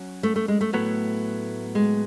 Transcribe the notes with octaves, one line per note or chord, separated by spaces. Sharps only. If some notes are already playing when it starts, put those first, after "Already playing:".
Already playing: F#3 C#4
A3
A3
G#3
A3
A2 F#3 A3 B3
G#3